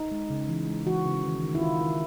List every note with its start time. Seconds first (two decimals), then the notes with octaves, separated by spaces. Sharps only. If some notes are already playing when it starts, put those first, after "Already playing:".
Already playing: D#4
0.11 G#3
0.30 C#3
0.49 E3
0.68 G#3
0.86 E3 F#4
1.05 C#3
1.24 D#3
1.43 D#3
1.55 E4
1.61 D#3 F4
1.81 D#3